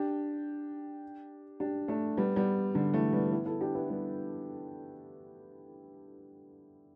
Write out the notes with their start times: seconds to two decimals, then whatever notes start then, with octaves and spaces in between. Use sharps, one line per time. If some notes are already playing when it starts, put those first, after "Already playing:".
Already playing: D4 G4
1.60 D4 G4
1.88 A3 D4
2.17 G3 B3
2.36 G3 B3
2.75 D3 G3
2.94 E3 A3
3.13 G3 B3
3.32 B3 E4
3.46 E4 A4
3.60 D4 G4
3.74 B3 E4
3.90 G3 B3